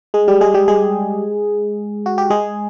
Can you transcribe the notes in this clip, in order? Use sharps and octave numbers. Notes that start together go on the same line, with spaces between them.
G#3 G#4
G3 G4
G#3 G#4
G3 G4
G#3 G#4
F#4
G4
G#3 G#4